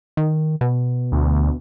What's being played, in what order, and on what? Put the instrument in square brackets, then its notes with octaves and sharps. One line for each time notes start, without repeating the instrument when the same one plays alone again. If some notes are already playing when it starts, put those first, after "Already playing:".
[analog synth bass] D#3
B2
[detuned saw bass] D2